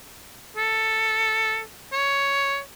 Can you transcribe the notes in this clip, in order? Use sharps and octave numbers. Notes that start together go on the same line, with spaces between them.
A4
C#5